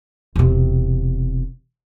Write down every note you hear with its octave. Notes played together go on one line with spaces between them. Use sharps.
E1 C3